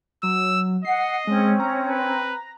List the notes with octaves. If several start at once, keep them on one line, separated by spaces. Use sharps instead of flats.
F#3 E6
D#5 F#5 C7
G#3 C4 C#4
A#5
B4